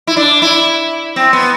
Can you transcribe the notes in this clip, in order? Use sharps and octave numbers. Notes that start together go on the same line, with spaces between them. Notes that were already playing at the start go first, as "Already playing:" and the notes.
E4
D4
E4
C4
B3